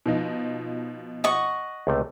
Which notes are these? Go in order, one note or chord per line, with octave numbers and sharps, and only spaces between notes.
B2 F3 D#4
D#5 F#5 C#6
C#2 C3 A3